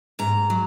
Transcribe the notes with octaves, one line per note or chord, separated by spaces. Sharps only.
G#2 A#5
F#3